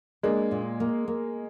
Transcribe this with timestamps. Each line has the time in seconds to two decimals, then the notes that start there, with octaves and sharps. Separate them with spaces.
0.23 G#3 A#3 D4
0.51 A#2
0.80 A#3
1.08 A#3